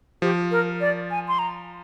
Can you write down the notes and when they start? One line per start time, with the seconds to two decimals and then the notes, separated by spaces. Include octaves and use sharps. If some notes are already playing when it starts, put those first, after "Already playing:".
0.22 F3 G4
0.51 A#4
0.81 D5
1.11 G#5
1.28 C6
1.39 A#5